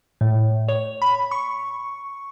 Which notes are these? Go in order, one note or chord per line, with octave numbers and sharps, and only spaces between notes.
A2
C#5
B5
C#6